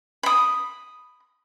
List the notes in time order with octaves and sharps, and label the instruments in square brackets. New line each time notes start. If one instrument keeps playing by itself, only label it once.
[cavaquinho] B5 D#6